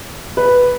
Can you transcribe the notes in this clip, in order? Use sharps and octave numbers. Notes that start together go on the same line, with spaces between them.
B4